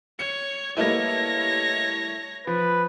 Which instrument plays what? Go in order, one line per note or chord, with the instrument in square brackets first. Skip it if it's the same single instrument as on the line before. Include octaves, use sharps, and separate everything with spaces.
[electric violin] C#5 [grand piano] C#7
[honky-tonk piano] G3 A3 E4 [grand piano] A#3 B4 D#5 [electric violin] C#5 A#6
[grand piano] F3 [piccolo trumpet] B4